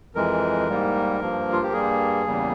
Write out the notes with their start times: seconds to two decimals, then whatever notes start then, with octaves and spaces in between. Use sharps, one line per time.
0.15 F2 E3 G#3 A#4
0.68 G#2 G3 A#3
1.21 G2 F3 A#3
1.52 F4
1.63 G4
1.73 G2 G3 A#3 G#4
2.26 E2 C#3 G3 A#3